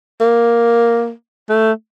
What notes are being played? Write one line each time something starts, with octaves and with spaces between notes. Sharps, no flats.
A#3
A3